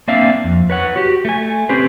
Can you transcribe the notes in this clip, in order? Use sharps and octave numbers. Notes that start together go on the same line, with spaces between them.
A#3 C4 D4 D5 E5 F5
F2
B4 C#5 F#5
F#4 G4
A3 G#5
C4 C#4 G4 B4 C5